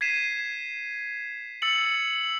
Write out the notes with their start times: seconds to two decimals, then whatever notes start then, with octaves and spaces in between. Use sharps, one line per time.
0.01 G#6 B6 C7 D#7 E7
1.62 E6 A6 C#7 F#7